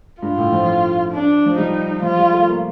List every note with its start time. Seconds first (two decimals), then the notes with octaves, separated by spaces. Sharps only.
0.22 G2 F4
0.38 A2
0.52 F3
1.12 D4
1.46 F3
1.58 G3 D#4
2.02 F3 F4
2.19 G3
2.33 A3
2.48 A#3